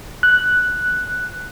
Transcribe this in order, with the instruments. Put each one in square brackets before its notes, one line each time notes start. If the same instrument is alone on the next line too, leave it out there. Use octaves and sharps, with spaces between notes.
[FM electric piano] F#6